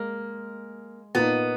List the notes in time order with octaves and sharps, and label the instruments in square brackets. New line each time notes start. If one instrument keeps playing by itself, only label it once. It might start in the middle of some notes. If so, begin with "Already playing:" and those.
Already playing: [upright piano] G#3 [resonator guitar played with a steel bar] A#3
[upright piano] A#2 A#3 D#4 [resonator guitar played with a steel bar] B3